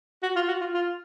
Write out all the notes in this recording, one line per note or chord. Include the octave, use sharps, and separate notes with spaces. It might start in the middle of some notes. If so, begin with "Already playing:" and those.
F#4
F4
F#4
F4
F4